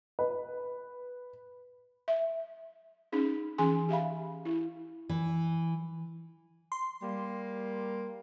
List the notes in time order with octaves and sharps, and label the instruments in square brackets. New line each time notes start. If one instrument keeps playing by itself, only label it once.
[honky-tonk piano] B4
[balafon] E5
C#4 D#4 G#4
E3 C#4 G#4 G#5 C6
G4 E5 F5 B5
E4
[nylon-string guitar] E3
[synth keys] C6
[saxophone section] G3 A#3